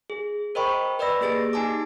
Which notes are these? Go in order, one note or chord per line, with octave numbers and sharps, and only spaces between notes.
G#4
A#4 C5 D#5 G5 B5 C#6
B4 D5 D#5 B5 E6 A#6
A#3 G4 G#4 A6 A#6 D7
D#4 G4 G#5 A5 D6